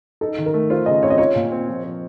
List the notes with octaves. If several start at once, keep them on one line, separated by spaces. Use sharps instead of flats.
D#4 A4
D#3
A#4
A3
F4 C5
C#3 D#5
C4 C#5
D#5
F4 C#5
A#2
C4
F3
F3